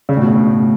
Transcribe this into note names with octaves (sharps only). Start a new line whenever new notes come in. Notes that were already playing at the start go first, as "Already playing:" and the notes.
C#3
A2
B2
A2